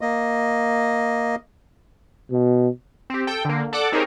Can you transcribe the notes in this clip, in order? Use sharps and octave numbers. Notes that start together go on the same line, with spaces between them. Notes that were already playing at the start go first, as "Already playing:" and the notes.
A#3 D#5
B2
C4 G4
A4 G5
D3 A#3
A4 D5 F#5 D6
C4 D#4 G4 G#4 A#4 C#5